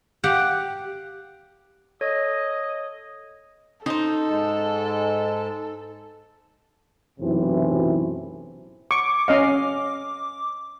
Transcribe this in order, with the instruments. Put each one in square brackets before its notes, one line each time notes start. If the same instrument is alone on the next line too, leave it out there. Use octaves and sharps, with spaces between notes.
[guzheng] G4 F5 F#5
[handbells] A4 C#5 [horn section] D#5
[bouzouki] D#4 C5 [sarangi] A4
[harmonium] G#2 G#3 A5
[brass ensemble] B1 F#2 A2 C3 E3
[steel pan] C#6 [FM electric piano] D6
[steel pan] C#4 D#5 F5